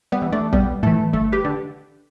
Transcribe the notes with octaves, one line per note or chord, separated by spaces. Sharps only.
G3 B3
E3
A3 D4
B1 G3 B3
A2 E3 A3
G1 A3
G4 B4
D3